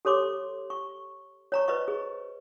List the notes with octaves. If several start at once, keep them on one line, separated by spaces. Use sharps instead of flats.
G4 A4 C#5 C6 D6
C#6
C#5 A#5 C#6
B4 C5 D#5 C#6
G#4